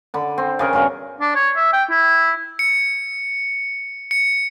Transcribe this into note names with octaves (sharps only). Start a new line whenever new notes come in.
D3 B5
C4
C#3 G#4 A#4
G2 B2 A#4
D4
C#5
E5
G5
E4
C#7
C#7